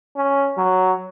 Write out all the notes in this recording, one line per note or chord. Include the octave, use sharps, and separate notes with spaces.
C#4
F#3